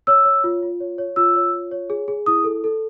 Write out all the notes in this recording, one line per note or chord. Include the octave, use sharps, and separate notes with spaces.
C#5 E6
C#5
F4
F4
C#5
C#5
F4 E6
C#5
F4
C#5
G#4
G#4
E4 D#6
A4
A4